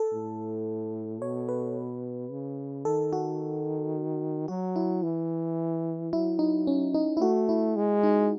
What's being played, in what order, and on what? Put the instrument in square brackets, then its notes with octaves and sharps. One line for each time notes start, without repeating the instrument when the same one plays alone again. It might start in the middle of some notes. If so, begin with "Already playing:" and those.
Already playing: [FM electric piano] A4
[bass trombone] A2
[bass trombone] B2 [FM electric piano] C#5
[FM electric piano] B4
[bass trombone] C#3
[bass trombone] D#3 [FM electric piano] A4
[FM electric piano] F#4
[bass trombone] F#3 [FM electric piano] F#4
[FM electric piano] E4
[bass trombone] E3
[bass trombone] F#3 [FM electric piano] E4
[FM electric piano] D#4
C#4
D#4
E4
[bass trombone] A3 [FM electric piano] F#4
[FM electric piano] E4
[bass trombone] G#3
[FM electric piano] D#4